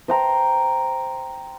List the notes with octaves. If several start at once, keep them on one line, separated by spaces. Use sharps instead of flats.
C5 G5 A#5